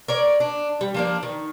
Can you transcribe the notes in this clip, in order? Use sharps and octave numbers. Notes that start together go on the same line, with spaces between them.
A#4 C#5 D5
D4
G3
F3 A#3 D4
D#3